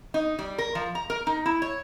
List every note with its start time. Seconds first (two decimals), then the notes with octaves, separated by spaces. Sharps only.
0.14 D#4
0.39 G3
0.58 A#4
0.75 F3
0.95 A#5
1.10 A#4
1.27 D#4
1.46 E4
1.62 C#5